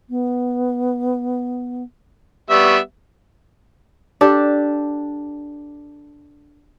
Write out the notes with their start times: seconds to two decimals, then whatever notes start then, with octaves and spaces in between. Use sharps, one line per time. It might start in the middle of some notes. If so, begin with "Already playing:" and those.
0.10 B3
2.50 G3 B3 E5 C#6
4.21 D4 G4 A4